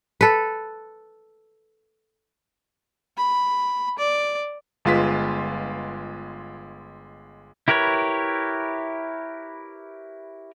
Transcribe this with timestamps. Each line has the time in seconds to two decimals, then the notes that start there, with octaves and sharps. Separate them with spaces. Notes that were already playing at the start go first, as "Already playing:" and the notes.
0.21 A4 B4
3.18 B5
3.99 D5
4.85 G1 G#3 F4 B4 B6
7.68 E4 G4 A#4 B4 C#5